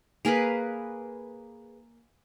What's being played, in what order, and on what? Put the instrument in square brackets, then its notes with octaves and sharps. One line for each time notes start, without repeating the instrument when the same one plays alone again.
[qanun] A#3 G#4 A#4 B4